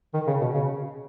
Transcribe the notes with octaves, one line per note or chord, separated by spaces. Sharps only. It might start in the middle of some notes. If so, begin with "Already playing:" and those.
D#3
C#3
B2
C#3